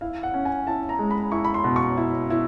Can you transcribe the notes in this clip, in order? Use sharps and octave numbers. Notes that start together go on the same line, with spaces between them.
E4 F5
F#5
C#4
G#5
E4 A5
A#5
G#3
B5
E4 C#6
B5
C6
B2
C#6
E4
E4